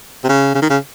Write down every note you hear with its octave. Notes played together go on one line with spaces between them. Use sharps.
C3
C#3
C#3
D#3
C#3